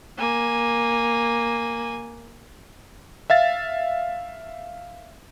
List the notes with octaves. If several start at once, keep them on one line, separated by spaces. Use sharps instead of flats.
A#3 G#5
E5 F5 A6